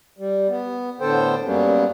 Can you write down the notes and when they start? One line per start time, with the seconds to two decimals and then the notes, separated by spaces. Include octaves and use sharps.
0.19 G3
0.48 B3
1.01 A2 D3 B3 A4 C5 G5
1.45 F#2 F#3 G3 A#3 B3 C#4